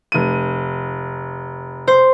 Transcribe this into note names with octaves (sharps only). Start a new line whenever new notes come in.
F1 D#7
C5